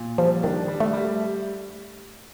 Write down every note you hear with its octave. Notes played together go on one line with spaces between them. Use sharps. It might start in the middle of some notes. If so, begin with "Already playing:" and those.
Already playing: A#2
F3 G3
D#3 D4
G3
A3
G3